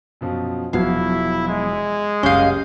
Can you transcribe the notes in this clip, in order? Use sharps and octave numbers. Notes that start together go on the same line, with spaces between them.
F#2 B2 F3
E1 F3 F#3 B3 E4 F#4 F5 G#6
G#3
F#1 C2 C#4 D#5 F5 G6